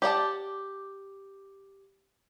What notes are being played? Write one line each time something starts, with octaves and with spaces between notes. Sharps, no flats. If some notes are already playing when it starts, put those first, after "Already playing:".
G4 D5 F#5 A5